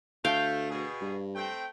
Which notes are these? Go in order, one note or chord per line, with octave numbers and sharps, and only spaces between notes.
D2 A3 F5 G5
B2 G#4
G2
A3 C4 G5